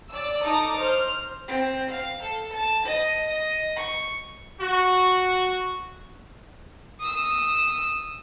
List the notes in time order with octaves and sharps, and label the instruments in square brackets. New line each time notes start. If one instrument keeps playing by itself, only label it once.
[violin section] D5 E6
D#4 A4 A#5 D6 D#6
C5 F6
[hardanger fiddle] C4
F5
A4
A5
D#5
D#5
C#6
[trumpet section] F#4
[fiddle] D#6 E6